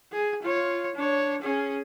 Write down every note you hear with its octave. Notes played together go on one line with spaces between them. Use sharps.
G#4
F4 C#5
D4 C#5
C#4 G#4